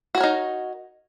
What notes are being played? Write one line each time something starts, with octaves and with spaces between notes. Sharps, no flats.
D#4 F#4 A#4 C#5